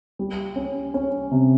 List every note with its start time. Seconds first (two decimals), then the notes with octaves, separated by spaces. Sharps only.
0.19 G3
0.56 C#4
0.94 C#4
1.31 C3